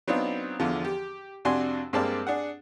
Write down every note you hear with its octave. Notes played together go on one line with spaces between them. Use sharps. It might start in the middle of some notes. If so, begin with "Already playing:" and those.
F#3 B3 C4 D4 D#4 F4
E2 D3 F3
G4
F2 C3 D4 F#4 G#5 C6
G2 G#3 A#3 C4 D5 A5
D4 G#4 F#5